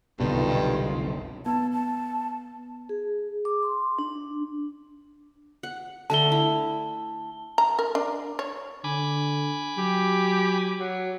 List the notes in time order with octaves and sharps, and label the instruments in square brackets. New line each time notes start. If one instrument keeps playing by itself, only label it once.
[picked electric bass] F#1 C2 D3 [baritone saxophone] G2 [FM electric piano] B2 [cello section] D#3 F4
[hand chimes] B3 [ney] A5
[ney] A5
[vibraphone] G#4
D6
C6
D4
[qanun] F#5
[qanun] D3 A3 A4 [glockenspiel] A5 G7
[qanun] E4
[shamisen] A#5
A#4
D4
C#5
[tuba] D3 [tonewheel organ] G#5 B5 D6
[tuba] F#3 [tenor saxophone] G4
[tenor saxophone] F#3